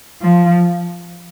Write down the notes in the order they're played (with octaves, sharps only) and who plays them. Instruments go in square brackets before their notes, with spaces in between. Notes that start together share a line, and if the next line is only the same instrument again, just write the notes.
[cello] F3